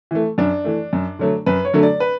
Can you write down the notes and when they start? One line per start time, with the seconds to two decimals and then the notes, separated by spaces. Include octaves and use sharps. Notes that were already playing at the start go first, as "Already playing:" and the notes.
0.11 E3 A3
0.38 F#2 D4
0.64 E3 A3
0.93 F#2
1.19 D3 F#3 A3
1.46 F#2 B4
1.65 C#5
1.74 D3 F#3 A3
1.83 D5
2.00 B4